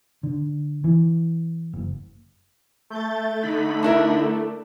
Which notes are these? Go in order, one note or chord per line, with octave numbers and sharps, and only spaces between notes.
D3
E3
F#1
A3 G6 A6
D3 D#4 B5
D4 E4 A#4